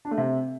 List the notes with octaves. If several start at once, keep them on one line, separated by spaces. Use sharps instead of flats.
D4
A3
C3